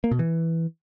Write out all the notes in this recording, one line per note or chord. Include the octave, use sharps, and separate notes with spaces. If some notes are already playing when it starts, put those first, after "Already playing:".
A#3
B2
E3